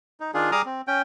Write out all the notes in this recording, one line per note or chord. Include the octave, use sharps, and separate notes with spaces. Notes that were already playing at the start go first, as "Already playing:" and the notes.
D#4
D#3 D4 F4 G#4
G3 G#4 A#5 D6 D#6 F6
C4
C#4 G5